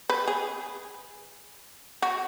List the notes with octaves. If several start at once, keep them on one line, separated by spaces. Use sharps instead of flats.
B4
G#4
F#4